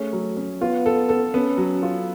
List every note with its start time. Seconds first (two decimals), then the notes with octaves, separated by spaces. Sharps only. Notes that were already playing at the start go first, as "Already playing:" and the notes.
Already playing: A3 C#4 G#4
0.13 F#3
0.37 C#4
0.61 B3 F4
0.86 A4
1.09 A4
1.34 B3 C#4
1.58 F#3
1.83 F4